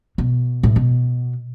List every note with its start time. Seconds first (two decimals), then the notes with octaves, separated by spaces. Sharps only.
0.18 B2
0.63 A2
0.76 B2